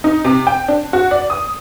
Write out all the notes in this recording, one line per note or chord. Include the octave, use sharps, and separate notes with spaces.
D#4
C3
G5
D4
F#4
D5
D#6